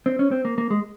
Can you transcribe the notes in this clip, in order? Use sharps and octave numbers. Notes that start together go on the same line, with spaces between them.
C4
C#4
C4
A#3
A#3
G#3